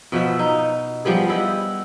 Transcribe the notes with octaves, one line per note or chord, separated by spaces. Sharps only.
B2 F3 B3 E5
D#4
F3 G3 B3 G#4
G3 E4 D#5 F#5